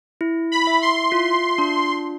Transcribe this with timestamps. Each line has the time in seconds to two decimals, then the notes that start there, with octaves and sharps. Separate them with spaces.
0.21 E4
0.52 B5
0.67 E5
0.82 C6
1.12 F4
1.58 D4